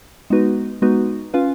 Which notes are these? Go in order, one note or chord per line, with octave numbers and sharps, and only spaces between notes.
G#3 B3 D#4 F#4 B4
G#3 B3 D#4 F#4 B4
C#4 F4 B4 F5